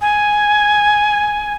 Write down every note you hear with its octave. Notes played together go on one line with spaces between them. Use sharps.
G#5